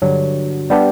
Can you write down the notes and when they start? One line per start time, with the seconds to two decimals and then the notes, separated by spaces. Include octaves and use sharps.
0.02 G2 D3 F#3
0.70 G3 B3 D4 G4